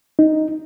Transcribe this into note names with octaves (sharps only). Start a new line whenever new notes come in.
D#4